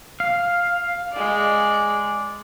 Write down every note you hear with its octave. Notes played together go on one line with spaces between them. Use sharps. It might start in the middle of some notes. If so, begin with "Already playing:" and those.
F5
G#3 D5